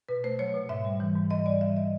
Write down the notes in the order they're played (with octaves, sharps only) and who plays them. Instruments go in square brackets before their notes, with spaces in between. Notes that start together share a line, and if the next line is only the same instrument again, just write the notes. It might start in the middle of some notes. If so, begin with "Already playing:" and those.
[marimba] B2 B4
A3 C5
F#3 C#5
B2
G#2 E5
G3
E3
G#2
G#2 D#5
G3 D5
E3 E5
D#5